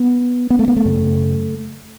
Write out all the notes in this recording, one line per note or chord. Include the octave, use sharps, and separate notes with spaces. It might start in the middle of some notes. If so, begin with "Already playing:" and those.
Already playing: B3
B3
A3
B3
A3
F#2 C#3